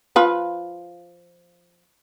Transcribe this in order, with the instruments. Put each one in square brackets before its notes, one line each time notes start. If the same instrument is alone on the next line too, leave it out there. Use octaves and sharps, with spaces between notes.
[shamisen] F3 F4 B4